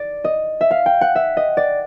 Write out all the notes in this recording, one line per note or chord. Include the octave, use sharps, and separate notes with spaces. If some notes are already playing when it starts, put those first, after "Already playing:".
Already playing: D5
D#5
E5
F5
G5
F#5
E5
D#5
D5